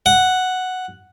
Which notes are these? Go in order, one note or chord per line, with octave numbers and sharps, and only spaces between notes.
F#5